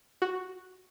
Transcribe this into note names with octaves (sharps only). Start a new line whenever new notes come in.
F#4